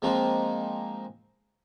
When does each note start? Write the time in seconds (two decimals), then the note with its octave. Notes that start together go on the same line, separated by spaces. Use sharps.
0.02 F3 G#3 A#3 C4 D#4 F4